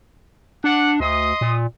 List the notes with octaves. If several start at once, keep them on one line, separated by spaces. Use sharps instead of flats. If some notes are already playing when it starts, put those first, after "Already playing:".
D4 D5 F#5
D2 D#5 C6 D#6
A#2